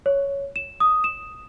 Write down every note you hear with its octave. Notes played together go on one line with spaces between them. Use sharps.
C#5
E7
D#6
E7